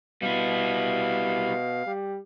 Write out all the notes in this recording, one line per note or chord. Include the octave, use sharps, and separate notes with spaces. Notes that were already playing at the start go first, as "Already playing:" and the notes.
B2 G3 E4 F5
G3